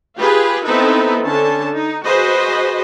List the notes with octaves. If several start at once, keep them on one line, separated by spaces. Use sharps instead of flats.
F4 G4 G#4 B4
B3 C4 D#4 E4 A4 B4
D3 C#4 A5
D#4
F#4 G#4 B4 C5 D#5